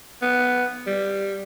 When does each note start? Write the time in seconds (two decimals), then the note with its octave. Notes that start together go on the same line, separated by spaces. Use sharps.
0.22 B3
0.87 G3